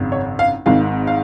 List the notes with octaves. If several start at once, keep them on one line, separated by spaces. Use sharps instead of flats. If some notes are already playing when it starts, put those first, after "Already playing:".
Already playing: G#1 F#2 C#3
C#5
F5
G#1 G#2 D#3 G#3 C4 F5
F5